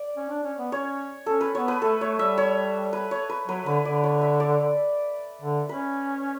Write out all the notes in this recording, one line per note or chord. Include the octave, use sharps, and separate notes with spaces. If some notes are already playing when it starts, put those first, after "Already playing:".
Already playing: D5
C#4
D4
C#4
B3
C#4 C#5
C#4 A4
B4
B3 C#5
B4
A3 A4
A3 C#5
G3 E5
C#5
B4
C#5
B4
F#3 B4
D3 B4
D3 D5
C#5
E5
D5
D3
C#4 B4